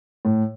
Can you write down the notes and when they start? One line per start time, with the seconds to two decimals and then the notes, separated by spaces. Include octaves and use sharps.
0.25 A2